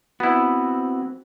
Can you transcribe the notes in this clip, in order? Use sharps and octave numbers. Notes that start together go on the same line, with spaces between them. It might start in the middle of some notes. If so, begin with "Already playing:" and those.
B3 C4 E4 F#4